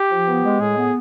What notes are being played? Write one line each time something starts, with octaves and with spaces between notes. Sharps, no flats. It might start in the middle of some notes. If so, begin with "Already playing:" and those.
Already playing: G4
F3
B3
G#3
A2 G#4
B3